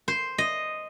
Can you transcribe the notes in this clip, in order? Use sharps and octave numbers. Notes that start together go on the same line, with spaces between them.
C5
D#5